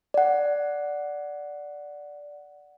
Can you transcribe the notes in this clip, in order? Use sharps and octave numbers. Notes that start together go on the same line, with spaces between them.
D5 F#5